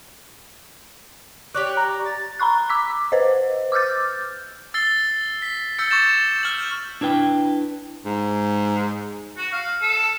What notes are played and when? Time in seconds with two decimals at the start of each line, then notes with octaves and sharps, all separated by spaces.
1.54 G4 C#5 D5 F#6
1.77 A#5
2.06 A6
2.39 A#5 B5 C#6 F#6
2.70 D6 E6 B6
3.12 B4 C5 D#5
3.72 D6 E6 F6 G6 A6
4.74 E6 A6 C7 G7
5.42 B6
5.78 E6 G6 A6 C#7
5.91 C#6 D6 G6 A6 E7
6.43 F6 G6 F#7
7.01 D4 E4 B4 G5
8.06 G#2
9.38 F#4
9.53 F5
9.82 A4